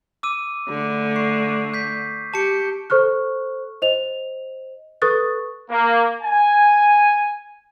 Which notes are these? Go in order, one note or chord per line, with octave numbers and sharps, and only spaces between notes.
D6 E6 D#7
D3 A3
C#6 C7
G6 B6
G4 A5 C#7
A4 C5 C#6 F6 F#6
C5 D#5 F7
A4 B4 C#6 D#6 F#6 A6
A#3
G#5